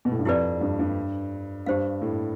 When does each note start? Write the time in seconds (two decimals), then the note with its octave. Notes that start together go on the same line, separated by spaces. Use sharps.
0.05 B2
0.11 A2
0.19 G2
0.25 F2 E4 G4 B4 D5
0.61 G2
0.79 G2
1.66 G2 G4 C5 F5
2.02 A2